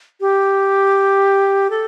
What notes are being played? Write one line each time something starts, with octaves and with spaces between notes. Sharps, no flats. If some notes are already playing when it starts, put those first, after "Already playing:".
G4
A4